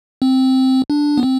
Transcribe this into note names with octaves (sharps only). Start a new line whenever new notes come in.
C4
D4
B3
C4